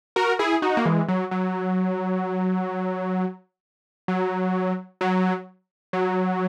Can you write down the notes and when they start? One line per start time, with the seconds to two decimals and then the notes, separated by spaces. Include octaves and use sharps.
0.16 F#4 A#4
0.39 E4 G#4
0.62 D#4 F#4
0.77 A#3
0.85 E3 G#3
1.08 F#3
1.31 F#3
4.08 F#3
5.01 F#3
5.93 F#3